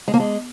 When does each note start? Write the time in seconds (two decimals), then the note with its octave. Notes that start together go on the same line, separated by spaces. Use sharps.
0.08 G#3
0.14 A#3
0.20 G#3